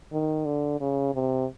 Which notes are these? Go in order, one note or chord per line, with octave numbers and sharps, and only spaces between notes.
D#3
D3
C#3
C3